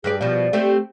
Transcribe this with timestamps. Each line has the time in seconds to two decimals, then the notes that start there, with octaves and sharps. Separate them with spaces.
0.04 G2 G#4 B4 D5
0.21 B2 F3 D5
0.53 A3 C4 G4